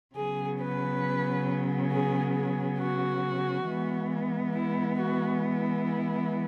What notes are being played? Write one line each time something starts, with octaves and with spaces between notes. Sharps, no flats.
C#3 F#3 B3 G#4
B4
G#4
G#4
F#4
E3 G#3 B3
E4
F#4
E4